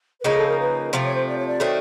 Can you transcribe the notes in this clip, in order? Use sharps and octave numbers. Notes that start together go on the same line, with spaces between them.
B4
C#3 F3 A#3 D#4 A#4
A4
A#4
B4
C3 F3 A3 C5
C#5
C5
D5
C#5
D5
D#3 F#3 A3 C4